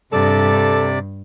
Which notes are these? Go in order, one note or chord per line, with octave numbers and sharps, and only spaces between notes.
G2 C3 A4 D5